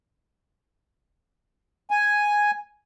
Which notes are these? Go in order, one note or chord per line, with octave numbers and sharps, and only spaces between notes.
G#5